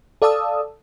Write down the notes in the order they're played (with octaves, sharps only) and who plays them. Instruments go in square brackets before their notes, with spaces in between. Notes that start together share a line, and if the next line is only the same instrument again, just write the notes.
[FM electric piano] A4 D5 F5 A5 D#6 E6